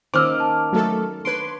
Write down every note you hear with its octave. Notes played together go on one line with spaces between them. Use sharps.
D#3 A#3 C#4 C5 D6 E6 F6
A5
F#3 A3 A4
D4 B4 C#5 C6 D7